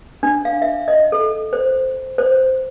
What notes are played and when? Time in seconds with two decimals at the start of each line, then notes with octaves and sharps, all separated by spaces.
0.23 D4
0.45 F5
0.62 E5
0.88 D#5
1.12 A4
1.53 C5
2.18 C5